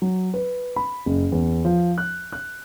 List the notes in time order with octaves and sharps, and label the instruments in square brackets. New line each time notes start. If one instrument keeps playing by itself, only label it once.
[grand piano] F#3
B4
B5
F#1
E2
F3
F#6
F#6